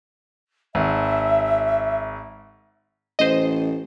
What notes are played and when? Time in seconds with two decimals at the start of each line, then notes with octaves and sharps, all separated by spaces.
0.75 G#1 E5
3.19 A1 C5 D#5